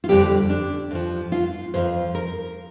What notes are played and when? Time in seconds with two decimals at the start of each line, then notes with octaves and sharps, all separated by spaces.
0.04 F4
0.09 F2 D3 G3 G4
0.50 D4
0.91 F2 F3
1.32 F4
1.74 F2 F3 C5
2.15 A#4